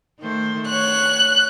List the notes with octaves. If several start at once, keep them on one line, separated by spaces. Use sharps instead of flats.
D#3 A3 C5
C#5 F#6